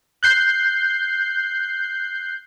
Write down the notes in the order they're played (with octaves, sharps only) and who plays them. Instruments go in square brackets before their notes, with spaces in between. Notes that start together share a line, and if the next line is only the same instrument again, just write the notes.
[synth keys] F#6 G6 C7